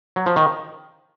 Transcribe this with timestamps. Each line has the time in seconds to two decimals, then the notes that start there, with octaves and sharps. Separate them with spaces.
0.16 F#3
0.26 F3
0.36 D#3